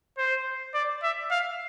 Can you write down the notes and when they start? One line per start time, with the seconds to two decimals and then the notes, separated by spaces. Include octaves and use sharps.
0.18 C5
0.74 D5
1.03 E5
1.31 F5